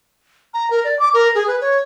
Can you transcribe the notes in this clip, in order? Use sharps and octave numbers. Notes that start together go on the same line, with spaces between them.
A#5
A#4
D5
D6
A#4
G#4
B4
C#5